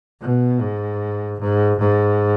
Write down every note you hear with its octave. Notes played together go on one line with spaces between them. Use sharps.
B2
G#2
G#2
G#2